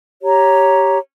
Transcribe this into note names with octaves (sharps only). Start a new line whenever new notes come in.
G4 C#5 A#5